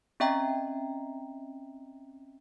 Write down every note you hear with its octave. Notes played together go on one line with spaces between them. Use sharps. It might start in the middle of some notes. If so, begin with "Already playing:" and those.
C4 C#4 D#5 E5 G5 A#5